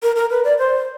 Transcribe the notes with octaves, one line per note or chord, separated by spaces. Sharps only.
A#4
A#4
B4
D5
C5